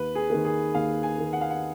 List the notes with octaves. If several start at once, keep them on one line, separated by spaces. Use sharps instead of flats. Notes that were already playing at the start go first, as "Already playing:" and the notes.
Already playing: D#2 B4
G#4
D#3 A#3
G#4
D#2 F5
G#5
D#3 A#3
F#5
F5
F#5